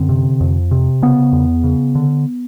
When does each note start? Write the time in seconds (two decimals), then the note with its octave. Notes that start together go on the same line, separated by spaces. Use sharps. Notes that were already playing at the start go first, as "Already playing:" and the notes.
Already playing: F#2 D3 C4
0.09 C3
0.40 F2
0.71 C3
1.02 C#3 B3
1.32 E2
1.64 C#3
1.95 D3